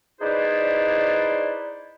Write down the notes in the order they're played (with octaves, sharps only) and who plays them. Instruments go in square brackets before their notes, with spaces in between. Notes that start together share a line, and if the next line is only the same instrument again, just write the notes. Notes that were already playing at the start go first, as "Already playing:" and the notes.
[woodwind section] D#4 E4 G#4 B4 C5 D5